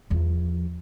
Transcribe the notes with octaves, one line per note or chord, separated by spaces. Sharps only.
E2 F3